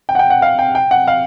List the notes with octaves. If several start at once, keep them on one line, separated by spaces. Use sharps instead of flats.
G5
F#5
G5
F#5
F5
G5
G5
F#5
F5